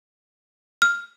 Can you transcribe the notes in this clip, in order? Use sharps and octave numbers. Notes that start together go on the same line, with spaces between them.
F6